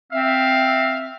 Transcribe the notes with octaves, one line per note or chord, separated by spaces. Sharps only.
C4 E5 F5